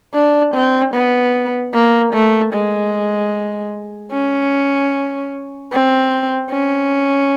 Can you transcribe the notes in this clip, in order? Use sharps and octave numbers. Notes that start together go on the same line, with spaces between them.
D4
C4
B3
A#3
A3
G#3
C#4
C4
C#4